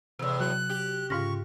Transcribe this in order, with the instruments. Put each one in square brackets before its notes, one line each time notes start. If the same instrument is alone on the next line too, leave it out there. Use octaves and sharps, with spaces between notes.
[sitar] E2 A2 [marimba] C3 E6
[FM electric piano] F#3 [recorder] F#6
[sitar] G4
[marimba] G#2 F6 A#6 [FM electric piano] C#3 F4 [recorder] C#6